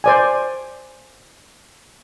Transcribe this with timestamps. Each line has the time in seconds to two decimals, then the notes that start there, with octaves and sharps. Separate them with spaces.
0.04 C5 D5 G#5